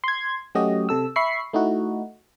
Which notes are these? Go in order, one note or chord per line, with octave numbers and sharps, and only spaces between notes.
C6 G#6
F#3 A3 C#4 F#4 G4 D#5
C3 A4 E6
E5 B5 C#6 C7
A3 D#4 E4 F#4